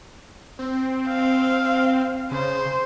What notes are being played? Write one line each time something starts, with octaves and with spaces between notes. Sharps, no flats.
C4
F5
C#3 C5